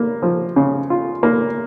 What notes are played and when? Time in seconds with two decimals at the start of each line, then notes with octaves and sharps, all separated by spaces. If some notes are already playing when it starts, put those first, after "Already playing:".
Already playing: A#3
0.22 F3
0.56 C#3
0.90 F4
1.23 A#3